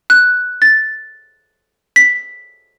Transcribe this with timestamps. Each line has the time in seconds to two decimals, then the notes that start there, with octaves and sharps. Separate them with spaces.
0.10 F#6
0.62 A6
1.96 B6